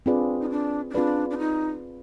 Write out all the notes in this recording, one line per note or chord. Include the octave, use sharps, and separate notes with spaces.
C4 D4 F4 G#4 B4 D5
D#4
D4
D#4
C4 D4 F4 G#4 B4 D5
D4
D#4